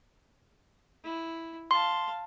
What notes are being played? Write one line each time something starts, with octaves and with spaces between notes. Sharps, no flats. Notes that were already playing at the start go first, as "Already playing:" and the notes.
E4
F5 A5 C6